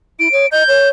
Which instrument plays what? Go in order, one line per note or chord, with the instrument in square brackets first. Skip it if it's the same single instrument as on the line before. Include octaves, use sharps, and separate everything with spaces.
[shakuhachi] E4 [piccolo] D7
[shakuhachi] C#5
[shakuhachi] D#5 [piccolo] G6
[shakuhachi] C#5